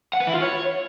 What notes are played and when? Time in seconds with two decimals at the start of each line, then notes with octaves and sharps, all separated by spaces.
0.13 F#5
0.20 B4
0.27 E4
0.34 F4
0.41 C#5